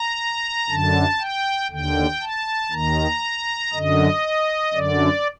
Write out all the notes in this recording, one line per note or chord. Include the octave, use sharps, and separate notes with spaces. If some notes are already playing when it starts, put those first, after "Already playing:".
Already playing: A#5
F#2 D3 A5
G5
D#2 D3 G5
A5
D#2 D#3 A#5
F#2 D3 D#5
F#2 D3 D5